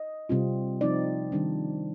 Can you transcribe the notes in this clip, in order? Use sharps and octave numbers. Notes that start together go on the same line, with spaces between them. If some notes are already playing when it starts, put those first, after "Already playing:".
Already playing: D#5
C3 G3 C4 F4
F3 C4 D#4 D5
D#3 G3 D4